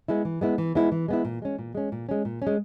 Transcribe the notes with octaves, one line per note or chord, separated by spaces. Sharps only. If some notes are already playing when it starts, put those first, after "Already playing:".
G#3 B3 E4
E3
G#3 B3 E4
E3
G#3 B3 E4
E3
G#3 B3 E4
A#2
G#3 C#4
A#2
G#3 C#4
A#2
G#3 C#4
A#2
G#3 C#4